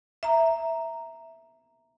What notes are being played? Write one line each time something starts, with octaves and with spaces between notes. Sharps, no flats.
E5 A#5